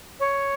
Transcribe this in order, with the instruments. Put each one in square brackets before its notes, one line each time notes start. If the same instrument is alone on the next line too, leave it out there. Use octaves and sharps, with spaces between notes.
[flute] C#5